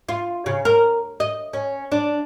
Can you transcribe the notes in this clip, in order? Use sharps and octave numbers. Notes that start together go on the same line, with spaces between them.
F4
C#3
A#4
D#5
C#4
D4